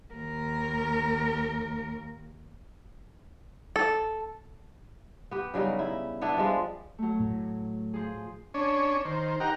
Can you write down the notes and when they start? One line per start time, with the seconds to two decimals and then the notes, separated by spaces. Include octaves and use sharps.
0.13 D#2 A#4
3.76 A4
5.31 B3 G4
5.54 C#3 F#3 G3 D#4
5.79 E4
6.22 B3 D4 E4
6.37 F3 G3 G#3 C4
6.98 F#3 A3
7.20 A2
7.94 F3 G#4
8.54 C#4 D4 C#5
9.05 D#3 C5
9.40 D#4 G4 A#4 F#5 G5 A#5